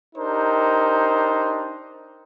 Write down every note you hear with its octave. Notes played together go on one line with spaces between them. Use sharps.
D4 D#4 G4 A#4 C5